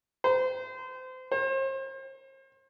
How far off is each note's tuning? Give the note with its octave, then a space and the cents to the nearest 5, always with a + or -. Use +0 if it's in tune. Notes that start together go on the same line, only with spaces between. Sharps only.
C5 -30
C5 +40